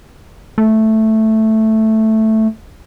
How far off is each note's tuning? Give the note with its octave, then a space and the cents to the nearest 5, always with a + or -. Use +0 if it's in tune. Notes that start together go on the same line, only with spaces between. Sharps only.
A3 +0